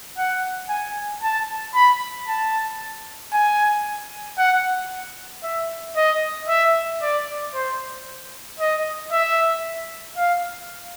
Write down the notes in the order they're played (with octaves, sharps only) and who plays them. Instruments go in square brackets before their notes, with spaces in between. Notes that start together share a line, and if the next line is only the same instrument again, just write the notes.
[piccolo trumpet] F#5
G#5
A5
B5
A5
G#5
F#5
E5
D#5
E5
D5
C5
D#5
E5
F5